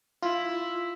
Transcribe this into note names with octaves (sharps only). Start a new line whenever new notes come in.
E4 F4